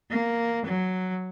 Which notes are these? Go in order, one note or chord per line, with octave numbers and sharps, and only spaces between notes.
A#3
F#3